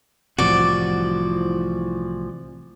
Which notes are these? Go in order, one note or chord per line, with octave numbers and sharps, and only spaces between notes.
C2 A2 C3 E3 F3 F#4 D5